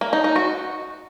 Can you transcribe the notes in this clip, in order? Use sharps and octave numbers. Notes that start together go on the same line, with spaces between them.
A#3
D#4
D#4
F#4